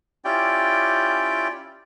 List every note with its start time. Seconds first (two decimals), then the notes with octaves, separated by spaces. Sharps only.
0.25 C#4 E4 F4 G4 D5 G5